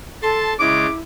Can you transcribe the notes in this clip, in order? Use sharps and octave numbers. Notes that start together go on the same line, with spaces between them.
A4 A5 C6
C#3 G#3 E4 D6